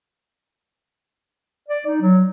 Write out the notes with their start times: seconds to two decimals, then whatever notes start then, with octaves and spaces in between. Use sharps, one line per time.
1.69 D5
1.86 D#4
2.01 F#3